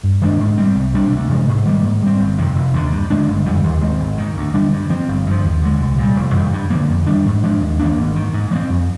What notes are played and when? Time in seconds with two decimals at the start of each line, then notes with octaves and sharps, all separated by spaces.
0.04 G2
0.21 D#3 G#3 D4
0.39 G#2
0.57 G3 C4
0.75 C2
0.94 C3 G3 D4
1.12 D2
1.29 C3 F3 G#3
1.48 G#2
1.65 D#3 G3 A#3
1.83 G#2
2.02 G3 C4
2.19 G1
2.38 F2 C3 D#3
2.56 F1
2.74 D#2 D3
2.92 G2
3.10 D3 G#3 D4
3.28 G1
3.46 F2 D3 G3
3.63 D#2
3.82 D#3 G#3 C4
4.00 G#1
4.18 G#2 D#3
4.37 D2
4.54 D3 G3 D4
4.73 G2
4.90 F3 C4
5.08 G1
5.26 G2 F3
5.45 D#2
5.62 D3 G#3
5.80 C2
5.98 A#2 G3
6.16 F1
6.34 F2 D#3 G3
6.53 G2
6.70 D3 F3 A#3
6.89 F2
7.07 D#3 G3 D4
7.25 G#2
7.43 F3 G#3 D4
7.60 D#2
7.79 D#3 A#3 D4
7.97 G#1
8.15 G#2 D#3
8.34 G#2
8.51 F3 G#3
8.55 C4
8.70 F2